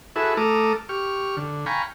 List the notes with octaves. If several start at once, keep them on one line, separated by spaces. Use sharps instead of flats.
E4 F#4 G#4 A4 B4 E5
A3 A4 A#5 D6 D#6 F6
G4 C#6 F6
D3
F5 G5 G#5 A#5 B5 C#6